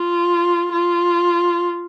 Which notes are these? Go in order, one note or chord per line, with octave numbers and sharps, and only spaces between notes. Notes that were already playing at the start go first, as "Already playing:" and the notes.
Already playing: F4
F4